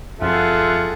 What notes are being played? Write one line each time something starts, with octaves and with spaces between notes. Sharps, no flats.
F#1 F2 F4 G#4 A4 E5 F#5